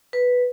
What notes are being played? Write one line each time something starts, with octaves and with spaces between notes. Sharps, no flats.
B4